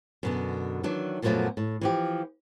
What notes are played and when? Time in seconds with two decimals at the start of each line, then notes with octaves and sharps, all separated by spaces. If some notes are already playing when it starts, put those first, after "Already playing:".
0.23 F#2 B2 D3
0.83 D#3 E3 F#3 D4
1.22 F#2 A#2 F3 F#3 A3 B3
1.57 A2
1.81 E3 F3 G4